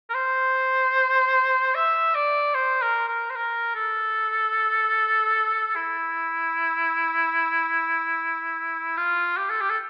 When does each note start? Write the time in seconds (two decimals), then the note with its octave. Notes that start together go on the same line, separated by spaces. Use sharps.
0.10 A#4
0.14 C5
1.75 E5
2.15 D5
2.55 C5
2.82 A#4
3.08 A#4
3.30 C5
3.36 A#4
3.75 A4
5.76 E4
8.97 F4
9.37 G4
9.50 A4
9.61 G4
9.70 A4